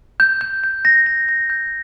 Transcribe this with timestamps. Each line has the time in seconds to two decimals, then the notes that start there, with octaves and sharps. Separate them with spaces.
0.20 G6
0.41 G6
0.64 G6
0.85 A#6
1.06 A#6
1.29 A#6
1.50 G6